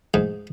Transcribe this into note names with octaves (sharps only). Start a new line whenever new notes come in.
G#2